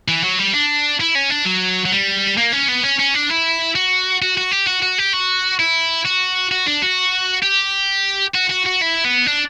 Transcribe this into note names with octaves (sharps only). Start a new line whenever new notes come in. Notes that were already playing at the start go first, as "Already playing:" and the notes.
E3
F#3
G3
D4
E4
C#4
D4
F#3
F#3
G3
A#3
C#4
B3
C#4
C#4
D4
E4
F#4
F#4
F#4
G4
F#4
F#4
G4
F#4
E4
F#4
F#4
D4
F#4
G4
F#4
F#4
F#4
E4
B3
D4